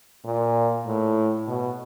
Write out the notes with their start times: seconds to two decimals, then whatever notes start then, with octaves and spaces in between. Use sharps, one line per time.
0.25 A#2
0.86 A2
1.48 B2